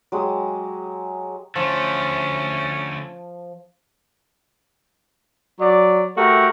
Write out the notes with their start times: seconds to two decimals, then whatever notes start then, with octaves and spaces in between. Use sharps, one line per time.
0.12 F#3 G#3 G4 D#6
1.56 D3 F3 A3 C#4
5.60 F#3 D5
6.16 A3 F#4 G4 A#4